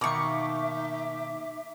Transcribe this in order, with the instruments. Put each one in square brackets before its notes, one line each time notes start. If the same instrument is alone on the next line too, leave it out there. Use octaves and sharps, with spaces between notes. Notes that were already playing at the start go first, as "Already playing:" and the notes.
[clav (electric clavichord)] B2 D#3 [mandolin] A#3 C#6 [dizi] D#4 [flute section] E5 D6